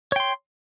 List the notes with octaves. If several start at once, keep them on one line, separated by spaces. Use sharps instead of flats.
C#5 G5 C6